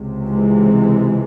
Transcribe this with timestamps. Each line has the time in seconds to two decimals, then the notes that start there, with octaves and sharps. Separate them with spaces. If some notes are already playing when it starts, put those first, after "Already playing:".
Already playing: C#2 C3
0.29 E3 G#3